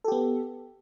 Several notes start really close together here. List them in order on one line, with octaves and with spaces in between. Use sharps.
A4 G4 B3